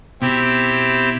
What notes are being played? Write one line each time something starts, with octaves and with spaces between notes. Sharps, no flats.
B2 C4 E4 G4